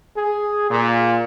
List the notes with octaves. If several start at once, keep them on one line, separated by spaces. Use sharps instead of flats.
G#4
A#2